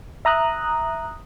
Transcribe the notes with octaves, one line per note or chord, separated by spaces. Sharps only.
E5 A#5 D#6 F#6